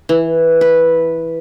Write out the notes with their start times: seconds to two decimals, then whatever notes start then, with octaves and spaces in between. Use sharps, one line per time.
0.09 E3
0.61 B4